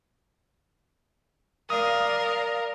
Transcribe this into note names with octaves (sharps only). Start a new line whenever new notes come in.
A#4 D5 F5 D#6